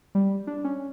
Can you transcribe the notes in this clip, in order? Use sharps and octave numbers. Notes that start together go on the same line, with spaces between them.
G3
D4
C#4